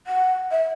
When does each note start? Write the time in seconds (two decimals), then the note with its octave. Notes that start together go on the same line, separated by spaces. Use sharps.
0.07 F#5
0.51 E5